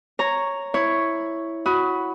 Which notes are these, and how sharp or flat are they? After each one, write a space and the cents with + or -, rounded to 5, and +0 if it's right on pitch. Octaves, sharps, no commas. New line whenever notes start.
C#5 +0 A#5 -5
E4 +0 C#5 +0
F#4 +0 B5 +0 D#6 +30